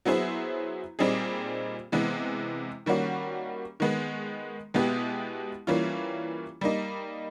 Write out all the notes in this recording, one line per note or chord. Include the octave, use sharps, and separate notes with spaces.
F#3 B3 E4 G#4 C5
A#2 G3 C4 D#4 G#4
C3 E3 G#3 B3
D#3 G3 A#3 C#4 F#4
D#3 G#3 B3
B2 G#3 B3 E4 G4
E3 G3 A#3 C#4 F4
G3 A#3 D#4